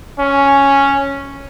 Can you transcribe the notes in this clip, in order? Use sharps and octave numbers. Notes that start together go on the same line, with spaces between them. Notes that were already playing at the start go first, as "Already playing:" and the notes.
C#4